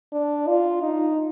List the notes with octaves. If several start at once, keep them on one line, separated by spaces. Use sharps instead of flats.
D4
F4
D#4